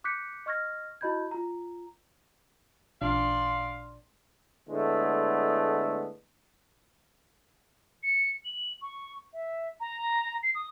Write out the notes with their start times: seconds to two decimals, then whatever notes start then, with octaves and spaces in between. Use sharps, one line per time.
0.04 D6 F#6 G6 B6 C#7
0.46 D#5 C#6 F6 G#6 A#6
1.01 E4 F#4 D#5 B5 G6 G#6
1.31 F4 A#5
3.02 A1 A#2 D4 D5 F5 C6
4.69 A2 D3 G#3 A3 B3
8.03 C#7
8.45 F#7
8.82 C#6
9.33 E5
9.80 A#5
10.43 C7
10.55 D#6